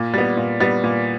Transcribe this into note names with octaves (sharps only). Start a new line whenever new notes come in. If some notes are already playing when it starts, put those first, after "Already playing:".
Already playing: A#2
G3 B3
A#2
G3 B3
A#2